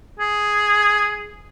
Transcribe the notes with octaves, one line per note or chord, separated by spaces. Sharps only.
G#4